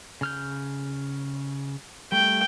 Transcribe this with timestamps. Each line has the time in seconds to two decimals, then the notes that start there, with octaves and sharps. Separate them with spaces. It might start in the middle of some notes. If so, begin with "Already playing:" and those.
0.21 C#3 F6 G6
2.12 G3 A3 G5